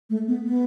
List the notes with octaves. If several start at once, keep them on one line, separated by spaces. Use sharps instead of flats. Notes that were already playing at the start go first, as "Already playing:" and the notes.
A3
B3
B3